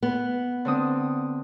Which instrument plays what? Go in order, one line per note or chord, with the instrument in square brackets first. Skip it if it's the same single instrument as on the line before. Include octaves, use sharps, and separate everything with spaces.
[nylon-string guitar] B3
[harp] D3 C4 D#6